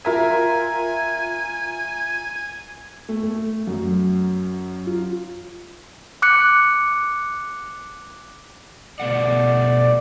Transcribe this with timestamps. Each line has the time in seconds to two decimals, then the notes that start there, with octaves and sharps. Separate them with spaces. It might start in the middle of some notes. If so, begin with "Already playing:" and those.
0.05 F4 A#4 E5 G#5
3.09 A3
3.23 A3
3.67 F#2
4.87 F4
6.22 D6 F#6 C#7
9.00 B2 A3 D5 F#5